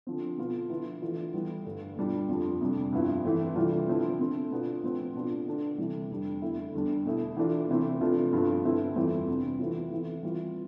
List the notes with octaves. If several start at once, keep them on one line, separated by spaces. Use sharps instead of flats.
D3 F3 C4
B2 B3 F4
D3 F3 B3 E4
E3 A3 D4 F4
E3 G3 B3
G2 D3 A3
B2 G3 D4 F4
F2 D3 F3
F2 C3 G3 D4
G2 F3 B3 E4
E3 A3 C4
C3 E3 G3 D4 F4
D3 F3 C4 E4
D3 A3 C4
B2 B3 D4 F4
A2 F3 C4
B2 B3 D4 F4
D3 A3 D4
C3 E3 G3
F2 D3 G3 D4
E2 D3 A3 E4
E2 D3 G3 D4
B2 A3 E4
E3 A3 D4 F4
C3 E3 A3 C4
C3 F3 A3 D4 F4
G2 F3 B3 F4
D3 A3 C4 E4
F2 E3 G3 C4 F4
C3 G3 B3 D4
E3 A3 C4 F4
E3 B3 E4
E3 G3 C4 F4